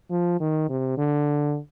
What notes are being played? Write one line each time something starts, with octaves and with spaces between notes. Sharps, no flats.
F3
D#3
C3
D3